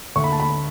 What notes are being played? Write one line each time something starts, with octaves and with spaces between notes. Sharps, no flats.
D2 C#6
B5
A5
B5